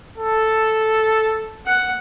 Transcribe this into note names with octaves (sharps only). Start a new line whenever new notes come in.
A4
F#5